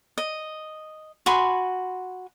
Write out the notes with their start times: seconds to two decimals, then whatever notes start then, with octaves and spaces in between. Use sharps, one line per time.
0.18 D#5
1.26 F#4 G#5 B5 C6